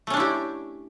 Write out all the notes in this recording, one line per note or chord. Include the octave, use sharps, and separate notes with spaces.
A3 C#4 D4 E4 G4